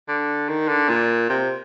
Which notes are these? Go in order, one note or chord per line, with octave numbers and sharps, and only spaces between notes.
D3
D#3
D3
A#2
C3